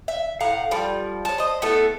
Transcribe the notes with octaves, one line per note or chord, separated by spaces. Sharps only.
E5
A2 F5 F#5 A#5
F3 G3
C#5 A5
C5 D#5
A3 B3 E4 A4